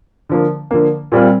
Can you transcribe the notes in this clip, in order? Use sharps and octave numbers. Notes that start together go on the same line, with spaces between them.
D3 F3 A#3
D3 F3 A#3
A#2 G3 C4 F4